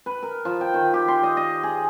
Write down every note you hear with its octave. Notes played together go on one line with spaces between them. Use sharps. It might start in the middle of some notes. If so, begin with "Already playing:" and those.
B4
A#4
F3
G5
D#3
G4
C6
D#5
D#5
G#4